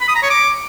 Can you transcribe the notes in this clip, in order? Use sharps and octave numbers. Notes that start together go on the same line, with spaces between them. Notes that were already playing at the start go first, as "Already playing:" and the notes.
B5
D#6
A#5
C#5
D6